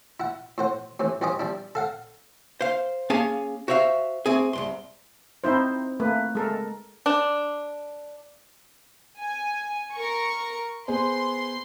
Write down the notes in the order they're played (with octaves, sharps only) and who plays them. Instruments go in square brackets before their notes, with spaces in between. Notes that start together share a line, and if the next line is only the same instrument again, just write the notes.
[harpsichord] E4 F#5
A2 C5 F#5
A2 C3 E3
E2 G2 C4 C#4 D#5 D6
G3 D4 E4
A4 F5 F#5
[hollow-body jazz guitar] C5 F5
A#3 C#4 G#4 F5 G#5 A5
F#4 C5 C#5 E5 F5
A3 C4 G#4
C2 F2 C6
[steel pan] C4 D#4 E4 C5
A3 A#3 B4
G#3 A4 A#4
[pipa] D4
[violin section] G#5
A#4 C#6
[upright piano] B3 G#4 C5 [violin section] C6